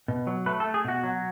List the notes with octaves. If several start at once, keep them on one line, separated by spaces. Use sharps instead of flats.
B2
F#3
A3 B4
A4
A3
G#4
B2 F#4
F#3